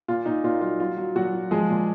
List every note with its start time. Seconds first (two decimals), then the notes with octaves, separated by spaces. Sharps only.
0.08 A#2 F4
0.26 A#2 D#4
0.44 A#2 F4
0.61 F#3 F4
0.80 F#3 F4
0.98 F#3
1.15 A#2 F#3 F#4
1.34 F#3
1.51 F3 G#3 G#4
1.70 A#2